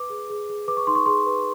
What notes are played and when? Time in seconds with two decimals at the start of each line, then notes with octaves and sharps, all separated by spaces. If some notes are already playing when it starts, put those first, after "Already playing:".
Already playing: B4 D6
0.10 G#4
0.30 G#4
0.49 G#4
0.67 B4 D6
0.77 C#6
0.87 D#4 C6
0.95 C#6
1.06 G#4 C6
1.26 B4